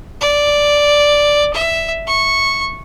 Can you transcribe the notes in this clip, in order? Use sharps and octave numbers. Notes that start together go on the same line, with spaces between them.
D5
E5
C#6